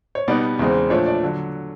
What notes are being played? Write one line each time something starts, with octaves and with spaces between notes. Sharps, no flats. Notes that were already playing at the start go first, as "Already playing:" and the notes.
C#5
B2 G3 B3 D#4 D5
E2 C#3 E3 G#3 C4
A#2 F3 A3 D4 C#5
D5
D3 F#3